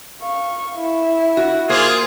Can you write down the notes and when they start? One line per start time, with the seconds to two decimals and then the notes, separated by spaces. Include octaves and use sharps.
0.22 F5 C#6
0.76 E4
1.37 F#4
1.69 A#3 F4 G#4 C5